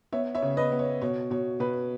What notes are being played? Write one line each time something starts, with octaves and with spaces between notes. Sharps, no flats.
B3 C#5 E5
C#5 E5
C#3
B4 D#5
B3
C#5
B2 C#5
B2 C#5
B2 B4